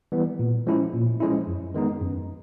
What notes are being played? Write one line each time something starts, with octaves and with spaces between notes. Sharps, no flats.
E3 G3 B3
A#2
F3 G#3 C#4 E4
A#2
F3 G#3 C#4 E4
F#2
D#3 G#3 B3 D#4
F#2